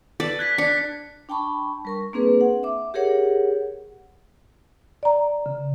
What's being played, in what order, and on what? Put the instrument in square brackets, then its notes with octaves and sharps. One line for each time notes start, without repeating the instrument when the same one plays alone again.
[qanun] A4 B4 D5
[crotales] F#6 G#6 B6
[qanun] D4 [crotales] B6 C#7
[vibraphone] D4 G5 A5 B5 C#6
G3 A#4 C#6
A#3 C4 D4 G#4 B4
F#5
E5 D6
G4 G#4 A#4 C#5 F#5
[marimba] D5 A#5
C#3